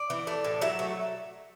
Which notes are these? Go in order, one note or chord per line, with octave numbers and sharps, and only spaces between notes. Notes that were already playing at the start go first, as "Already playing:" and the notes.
Already playing: D5
E3
A3
A2
F#3 E5
A3